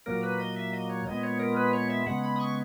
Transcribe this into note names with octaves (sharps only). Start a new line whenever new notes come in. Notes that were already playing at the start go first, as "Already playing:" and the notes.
A#2 F#3 A#3 A#4
B4
D#5
E5
D#5
C#5
A#2 G#3 B3 D#5
C#5
A#4
B4
C#5
E5
C#3 G#3 B3 F#5
B5
D#6
C#6